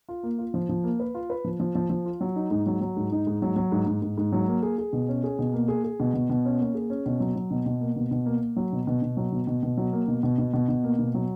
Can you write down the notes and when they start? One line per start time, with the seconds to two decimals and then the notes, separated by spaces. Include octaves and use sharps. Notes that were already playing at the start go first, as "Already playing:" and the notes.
0.09 F4
0.23 A#3
0.38 F4
0.54 F3
0.69 F3
0.84 A#3
1.00 B4
1.15 F4
1.30 B4
1.45 F3
1.60 F3
1.75 F3
1.90 F3
2.05 F4
2.21 F#3
2.36 D#4
2.51 G#2
2.66 F#3
2.81 F#3
2.96 G#2
3.12 D#4
3.27 G#2
3.42 F#3
3.56 F#3
3.72 G#2
3.87 G#2
4.02 G#2
4.18 G#2
4.32 F#3
4.47 A#3
4.63 G#4
4.78 G#4
4.93 B2
5.08 C#4
5.24 G#4
5.39 B2
5.53 A#3
5.68 G#4
5.84 G#4
6.00 B2
6.14 B2
6.30 B2
6.45 C#4
6.59 A#3
6.75 G#4
6.90 C#4
7.06 B2
7.20 F#3
7.35 F#3
7.51 B2
7.66 B2
7.81 A#3
7.96 B2
8.11 B2
8.26 A#3
8.41 A#3
8.56 F#3
8.72 B2
8.87 B2
9.02 B2
9.17 F#3
9.32 B2
9.47 B2
9.63 B2
9.77 F#3
9.93 A#3
10.08 B2
10.23 B2
10.38 B2
10.54 B2
10.69 B2
10.84 A#3
10.99 B2
11.14 F#3